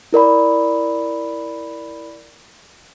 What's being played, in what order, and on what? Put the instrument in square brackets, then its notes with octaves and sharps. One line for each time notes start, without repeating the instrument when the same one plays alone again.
[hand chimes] E4 A#4 D5 B5